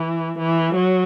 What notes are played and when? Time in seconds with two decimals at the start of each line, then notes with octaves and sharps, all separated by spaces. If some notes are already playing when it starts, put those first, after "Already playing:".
Already playing: E3
0.38 E3
0.75 F#3